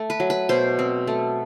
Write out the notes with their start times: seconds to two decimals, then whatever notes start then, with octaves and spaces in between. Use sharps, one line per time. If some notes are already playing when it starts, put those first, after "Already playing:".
Already playing: A3
0.10 B4
0.20 F#3
0.30 B4
0.49 B2 C5
0.79 C4
1.07 A3